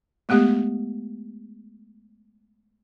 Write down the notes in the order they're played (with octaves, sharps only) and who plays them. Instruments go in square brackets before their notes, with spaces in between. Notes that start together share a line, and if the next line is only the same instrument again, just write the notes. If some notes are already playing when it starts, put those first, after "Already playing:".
[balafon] G#3 A3 B3 G4